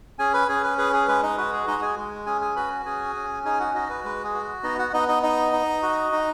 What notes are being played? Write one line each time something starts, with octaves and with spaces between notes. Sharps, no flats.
C#4 G#4 G#5
B4 B5
C#4 G#4 G#5
B4
G#4 B4
G#4
G#3 B4
D#4 D#5
F#4 B4
G#4
G#3 D#4 D#5
G#4 G#5
G#3
C#4 G#4 G#5
G#4 G#5
F#4 B4 B5
C#4 G#4 G#5
C#4
D#4 G#4 G#5
F#4 F#5
D#4 F#4 D#5
B4
G#3 B4
G#4
F#4
B3 D#4 D#5
F#4 F#5
B3 D#4 D#5
D#4 D#5
D#4 D#5
D#4
F#4
D#4